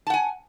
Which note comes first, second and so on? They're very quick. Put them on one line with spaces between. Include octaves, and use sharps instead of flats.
A5 F#5 G#5